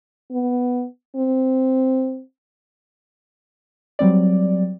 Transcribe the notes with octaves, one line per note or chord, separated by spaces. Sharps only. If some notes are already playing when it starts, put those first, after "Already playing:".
B3
C4
F#3 G3 C4 D5